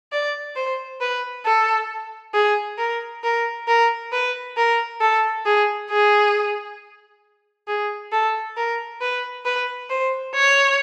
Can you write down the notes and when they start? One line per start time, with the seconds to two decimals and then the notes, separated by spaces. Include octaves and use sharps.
0.12 D5
0.56 C5
1.01 B4
1.45 A4
2.34 G#4
2.78 A#4
3.24 A#4
3.68 A#4
4.12 B4
4.57 A#4
5.00 A4
5.46 G#4
5.90 G#4
7.68 G#4
8.12 A4
8.57 A#4
9.01 B4
9.45 B4
9.90 C5
10.35 C#5